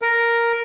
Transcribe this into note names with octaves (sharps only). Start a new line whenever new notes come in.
A#4